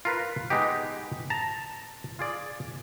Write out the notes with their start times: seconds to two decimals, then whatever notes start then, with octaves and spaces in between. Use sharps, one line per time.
0.05 F4 A#4 B4
0.50 G#3 B3 D#4 G4
1.30 A5 A#5
2.19 F4 G#4 D5